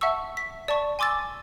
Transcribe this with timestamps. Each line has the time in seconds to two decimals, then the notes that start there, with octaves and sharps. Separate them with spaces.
0.01 E5 F#5 A5 C#6 E6
0.37 B6
0.68 D5 A5 C#6
0.99 G#5 C6 D6 E6 A6